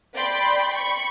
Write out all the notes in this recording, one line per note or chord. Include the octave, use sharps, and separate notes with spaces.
D5 G5 B5 C6
B5 C#6